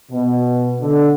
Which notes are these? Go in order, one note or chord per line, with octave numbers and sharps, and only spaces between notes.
B2
D3